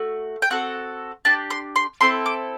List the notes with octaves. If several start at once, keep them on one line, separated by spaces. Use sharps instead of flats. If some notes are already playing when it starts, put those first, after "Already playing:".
Already playing: A3 F#4
G5
C4 F#4 A4 F#5
D4 G4 A5
C6
C6
C4 E4 A4 C6
D6